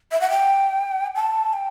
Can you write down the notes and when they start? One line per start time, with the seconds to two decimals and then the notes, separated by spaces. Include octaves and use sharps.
0.11 E5
0.21 F#5
0.30 G5
1.16 A5
1.53 G5